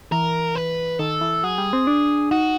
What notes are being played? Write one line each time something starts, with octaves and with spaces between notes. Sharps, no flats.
E3 A#4
B4
D#3 A4
E3
F#3 G#4
G3
C4
D4
D#4 F#4